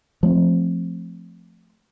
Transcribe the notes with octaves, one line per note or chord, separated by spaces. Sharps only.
F3 A3 C4